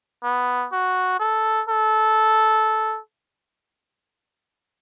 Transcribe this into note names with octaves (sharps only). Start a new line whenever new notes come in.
B3
F#4
A4
A4